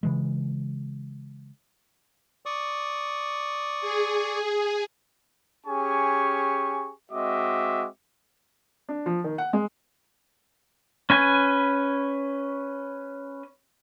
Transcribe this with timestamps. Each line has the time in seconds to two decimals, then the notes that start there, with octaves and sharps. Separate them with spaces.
0.03 C#3 E3 G#3
2.46 D5 C#6 D#6
3.81 G#4
5.66 C#4 G4 G#4 G#5 C#6
7.12 G#3 C4 F#4 D#5 E5 D6
8.89 D4
9.06 F3
9.24 D#3
9.38 F#5
9.53 G#3
11.10 C#4 B4 G#5